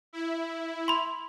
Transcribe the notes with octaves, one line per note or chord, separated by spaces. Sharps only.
E4
B5 C6